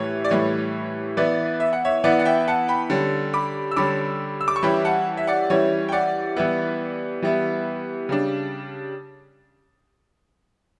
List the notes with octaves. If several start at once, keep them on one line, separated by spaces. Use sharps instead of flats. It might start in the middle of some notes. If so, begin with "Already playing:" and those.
Already playing: A2 E3 G3 C#5
D5
A2 E3 G3 C#5
E3 B3 E4 B4 D5
E5
F#5
C#5 E5
E3 B3 E4 D5 F#5
F#5
E5 G5
F#5 A5
G5 B5
D3 G3 C#4
B5 D6
E6
D3 G3 C#4 B5 D6
E6
D6
C#6
E3 G3 C#4 E4 G5 B5
F#5 A5
E5
D5 F#5
E3 G3 C#4 E4 C#5
G5
D5 F#5
E3 G3 B3 E4
E3 G3 B3 E4
C#3 G3 D4